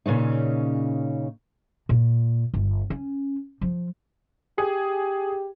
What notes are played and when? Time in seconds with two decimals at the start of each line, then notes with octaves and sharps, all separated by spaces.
0.06 A#2 C#3 C#4 D#4
1.89 A#2
2.54 G1
2.90 C#4
3.61 F3
4.58 G4 G#4